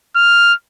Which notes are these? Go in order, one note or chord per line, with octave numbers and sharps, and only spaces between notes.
F6